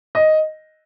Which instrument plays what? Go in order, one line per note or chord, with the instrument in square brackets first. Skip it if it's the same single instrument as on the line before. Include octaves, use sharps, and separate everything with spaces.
[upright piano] D#5